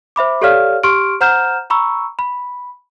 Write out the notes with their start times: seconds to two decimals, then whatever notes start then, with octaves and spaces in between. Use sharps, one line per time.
0.16 C5 E5 B5 D6
0.41 G4 A4 C#5 D5 F5 F6
0.83 G4 C6 C#6 F6 D7
1.21 C5 F#5 A#5 F6 G6 E7
1.70 A#5 B5 C#6 E6
2.19 B5